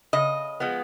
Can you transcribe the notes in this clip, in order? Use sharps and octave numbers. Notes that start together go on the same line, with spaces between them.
C#3 D#5
F3 G#3 B3